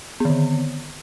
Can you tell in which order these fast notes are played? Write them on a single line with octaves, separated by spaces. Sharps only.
B3 D#3 D3